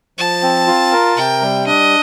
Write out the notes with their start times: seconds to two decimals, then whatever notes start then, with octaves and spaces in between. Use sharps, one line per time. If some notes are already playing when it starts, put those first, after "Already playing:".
0.18 F3 A5
0.42 C4
0.67 F4
0.92 A#4
1.17 C3 G5
1.42 G3
1.66 D4 D#5